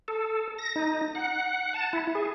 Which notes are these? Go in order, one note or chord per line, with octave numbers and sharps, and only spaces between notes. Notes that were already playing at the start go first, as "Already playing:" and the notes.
A4
A#6
D#4
F#5
A5
E4
G#4